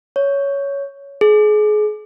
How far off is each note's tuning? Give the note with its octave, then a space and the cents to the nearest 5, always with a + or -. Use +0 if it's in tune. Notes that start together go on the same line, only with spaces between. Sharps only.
C#5 +10
G#4 +30